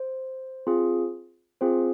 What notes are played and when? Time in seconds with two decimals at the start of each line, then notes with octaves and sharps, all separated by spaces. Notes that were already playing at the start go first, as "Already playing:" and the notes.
Already playing: C5
0.67 C4 F4 G#4
1.61 C4 F4 G#4 C5